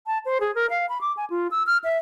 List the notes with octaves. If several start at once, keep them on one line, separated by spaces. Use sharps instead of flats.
A5
C5
G#4
A#4
F5
B5
D6
G#5
F4
E6
F6
E5